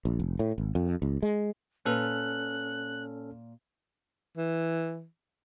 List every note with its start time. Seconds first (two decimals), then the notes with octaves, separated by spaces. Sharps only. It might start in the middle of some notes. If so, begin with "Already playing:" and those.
0.05 A#1
0.20 F1
0.39 A2
0.58 G#1
0.75 F2
1.02 C#2
1.22 G#3
1.86 A#2 C#4 A4 B4 F6 F#6
4.37 E3